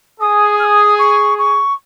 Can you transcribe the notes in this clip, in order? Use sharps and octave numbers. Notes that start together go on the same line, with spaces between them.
G#4 D#6
F6
D#6
C#6
C#6